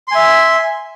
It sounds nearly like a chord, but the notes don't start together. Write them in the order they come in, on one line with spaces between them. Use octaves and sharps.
C6 G#5 E5